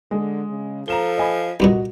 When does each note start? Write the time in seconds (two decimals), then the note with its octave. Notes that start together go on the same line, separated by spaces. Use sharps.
0.11 D3 G#3
0.50 C#3
0.88 F3 A4 A#5 E7 G7
1.18 D#5 G#5 B5
1.60 C2 G2 A#2 F#4 D#5